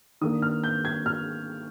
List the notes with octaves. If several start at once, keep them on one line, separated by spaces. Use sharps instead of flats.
D#3 A#3 D4 D#6
F6
G6
G#6
F6